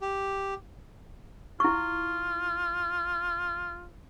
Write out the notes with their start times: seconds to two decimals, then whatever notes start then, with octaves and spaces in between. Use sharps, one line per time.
0.01 G4
1.60 E4 F4 C#6